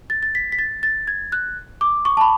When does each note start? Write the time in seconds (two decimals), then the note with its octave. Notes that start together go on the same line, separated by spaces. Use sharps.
0.10 A6
0.23 A6
0.35 B6
0.52 B6
0.59 A6
0.83 A6
1.08 G#6
1.32 F#6
1.81 D6
2.05 C#6
2.17 A5
2.21 B5